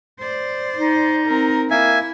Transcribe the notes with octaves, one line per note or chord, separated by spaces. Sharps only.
C5 D5
D#4
C4 A#4
A#3 E4 E5 G#5